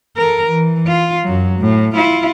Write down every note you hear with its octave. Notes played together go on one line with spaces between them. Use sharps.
A4 A#4
E3
F4
F#2 F#3
A2
E4 F4